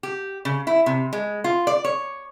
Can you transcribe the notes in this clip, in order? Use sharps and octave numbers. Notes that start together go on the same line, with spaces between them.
G4
C#3
E4
C3
G#3
F4
D5
C#5